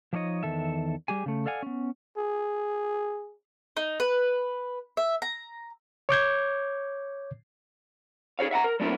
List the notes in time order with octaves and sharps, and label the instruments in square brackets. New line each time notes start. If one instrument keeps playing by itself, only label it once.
[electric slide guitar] F3 D4 D#4 C#5 D#5
E2 D#3 A4 E5
G3 G4 G#4 G#5
C#3 A3
A4 D5 F5 F#5 G#5
B3 C#4
[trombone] G#4
[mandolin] D#4
B4
E5
A#5
[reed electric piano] C#5 D6 G6 G#6
[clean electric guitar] D#4 G#4 C5 C#5 F5
E5 F#5 A5 A#5
A#4
F#3 A3 A#3 D4 E4